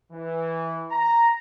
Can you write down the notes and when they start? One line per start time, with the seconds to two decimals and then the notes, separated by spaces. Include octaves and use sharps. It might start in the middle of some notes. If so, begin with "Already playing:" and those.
0.12 E3
0.91 A#5